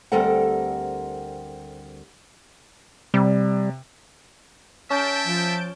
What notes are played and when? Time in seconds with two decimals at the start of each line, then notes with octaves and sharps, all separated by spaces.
0.12 D2 G3 C4 A4 A#4 F#5
3.14 C3 G3
4.90 C#4 E5 A5 G6 D7
5.27 F3